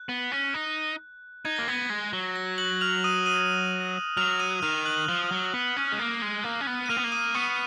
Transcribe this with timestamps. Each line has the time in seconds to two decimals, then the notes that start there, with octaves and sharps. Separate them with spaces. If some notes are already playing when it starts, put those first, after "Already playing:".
Already playing: F#6
0.09 B3
0.32 C#4
0.54 D#4
1.45 D#4 G#6
1.56 A#3 A#6
1.68 B3 G#6
1.90 G#3
2.13 F#3
2.36 A#6
2.58 F#6 F#7
2.81 F6 F7
3.04 D#6 D#7
3.26 D#6 D#7
4.17 F#3 F6 F7
4.39 D#6 D#7
4.62 D#3 F6 F7
4.85 F#6 F#7
5.09 F3
5.31 F#3
5.54 B3
5.77 C#4
5.92 G#3
5.99 A#3
6.22 G#3
6.44 A#3
6.61 C#4
6.67 B3
6.86 D#7
6.89 A#3 F6 F7
6.97 B3
7.04 A#3
7.12 D#6 D#7
7.35 B3 C#6 C#7